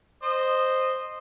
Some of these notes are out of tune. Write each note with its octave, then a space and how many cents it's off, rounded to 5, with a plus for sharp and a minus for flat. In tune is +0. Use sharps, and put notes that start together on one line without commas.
C5 +0 D#5 -15